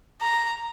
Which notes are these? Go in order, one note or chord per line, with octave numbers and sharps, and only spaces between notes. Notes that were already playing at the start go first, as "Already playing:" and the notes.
A#5